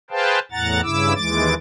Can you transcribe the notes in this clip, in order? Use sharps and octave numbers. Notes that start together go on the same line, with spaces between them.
G#4 B4 C5 F5 G5 A5
E2 A2 F#5 A#5 A6
G2 C#3 E4 D6 E6
D#2 E3 G#3 D6 A6